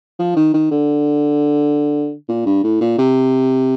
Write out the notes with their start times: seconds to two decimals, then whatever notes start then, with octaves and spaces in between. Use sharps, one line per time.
0.19 F3
0.36 D#3
0.53 D#3
0.71 D3
2.28 A#2
2.46 G2
2.64 A2
2.81 A#2
2.98 C3